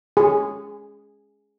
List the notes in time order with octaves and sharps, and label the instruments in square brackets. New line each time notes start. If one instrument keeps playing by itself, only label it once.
[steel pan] G#4